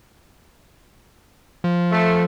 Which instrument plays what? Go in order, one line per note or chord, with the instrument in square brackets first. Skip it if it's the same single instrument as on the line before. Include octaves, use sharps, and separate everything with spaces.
[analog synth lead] F3
[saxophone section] A3